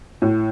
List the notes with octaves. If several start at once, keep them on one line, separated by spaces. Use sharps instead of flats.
A2